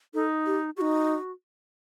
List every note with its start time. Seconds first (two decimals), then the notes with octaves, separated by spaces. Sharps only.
0.14 D#4 A4
0.46 G4
0.76 F#4 G4
0.81 D#4